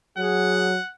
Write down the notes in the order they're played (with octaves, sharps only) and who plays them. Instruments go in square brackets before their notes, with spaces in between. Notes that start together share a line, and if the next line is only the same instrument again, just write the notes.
[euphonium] F#3 [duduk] G#4 [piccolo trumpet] F#5